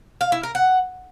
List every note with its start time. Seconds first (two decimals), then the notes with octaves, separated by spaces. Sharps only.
0.21 F5
0.32 E4
0.43 A#4
0.55 F#5